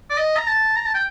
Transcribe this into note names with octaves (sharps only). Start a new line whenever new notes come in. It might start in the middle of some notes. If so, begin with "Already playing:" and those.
D5
D#5
A#5
A5
A#5
A5
G5